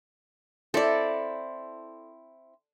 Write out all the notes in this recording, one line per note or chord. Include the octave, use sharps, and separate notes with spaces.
C4 E4 A4 D5